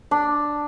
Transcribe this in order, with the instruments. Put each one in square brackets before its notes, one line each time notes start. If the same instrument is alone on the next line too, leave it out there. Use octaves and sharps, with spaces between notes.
[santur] D4